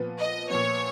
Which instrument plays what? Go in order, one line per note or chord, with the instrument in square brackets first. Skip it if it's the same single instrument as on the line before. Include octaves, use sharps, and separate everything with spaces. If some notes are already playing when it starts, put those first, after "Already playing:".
Already playing: [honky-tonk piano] A#2 F3 B3
[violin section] D#5
[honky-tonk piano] A#2 F3 B3 [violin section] C#5